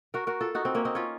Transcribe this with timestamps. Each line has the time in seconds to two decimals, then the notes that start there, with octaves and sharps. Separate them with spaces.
0.14 F#4 A#4
0.27 F#4 A#4
0.41 F4 A4
0.55 D#4 F#4
0.65 C4 D#4
0.75 A#3 C#4
0.85 C4 D#4
0.95 C#4 F4